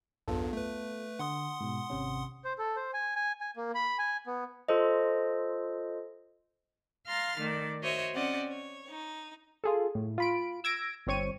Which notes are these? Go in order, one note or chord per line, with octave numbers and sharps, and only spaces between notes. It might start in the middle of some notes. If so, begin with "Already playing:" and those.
B1 E2 G2 B3 F4 A4
A3 B4
D3 F#5 C6 D#6
G#2 B2
G#1 C3 C#4
C5
A4
C5
G#5
G#5
G#5
A#3
B5
G#5
B3
F4 A4 C5 D#5
F5 A#5 C6 F6 A6
D#3 A3 D5
F#4 C5 C#5 D#5 E5
C4 C#4 D5 D#5 F#5
C#5
D#4
F4 G#4 A4
A2
F4 B5 D7
E6 G#6 A#6 D7
G1 C4 C#5 C#6 D#7